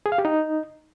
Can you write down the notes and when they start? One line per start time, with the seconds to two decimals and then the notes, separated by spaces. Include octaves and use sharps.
0.06 G#4
0.12 F5
0.18 G4
0.25 D#4